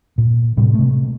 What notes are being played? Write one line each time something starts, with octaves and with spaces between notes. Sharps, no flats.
A#2
A2 C3 G3
C3 A3